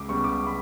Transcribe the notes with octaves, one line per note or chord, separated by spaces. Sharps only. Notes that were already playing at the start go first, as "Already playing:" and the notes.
Already playing: C#2 D6
C#3 G3 B3 C#6
D6
B5